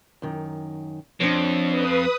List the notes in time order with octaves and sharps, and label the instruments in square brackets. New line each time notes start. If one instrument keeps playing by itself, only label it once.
[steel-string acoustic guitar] F#2 D#3
[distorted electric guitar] F2 [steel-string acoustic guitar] D4 C5 C#5
[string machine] B4 D#6